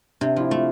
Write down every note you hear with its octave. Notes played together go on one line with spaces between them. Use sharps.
C3 D4
F3 E4
A3 F4